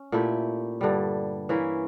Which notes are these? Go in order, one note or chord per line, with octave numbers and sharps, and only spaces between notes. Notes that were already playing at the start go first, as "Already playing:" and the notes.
Already playing: C#4
A#2 A3 E4 G4
G2 D3 G3
E3 A#3 C#4 E4